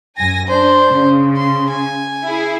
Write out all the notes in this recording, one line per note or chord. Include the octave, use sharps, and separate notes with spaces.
F#2 G#5 A#6
D4 C5
C#3
C6
G#5
E4 G#4